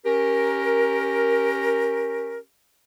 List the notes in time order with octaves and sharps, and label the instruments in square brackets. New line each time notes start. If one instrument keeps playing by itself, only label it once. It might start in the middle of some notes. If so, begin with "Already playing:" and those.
[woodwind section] C#4 G4 A#4